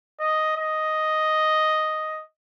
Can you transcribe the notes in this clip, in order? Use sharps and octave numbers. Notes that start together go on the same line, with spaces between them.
D#5
D#5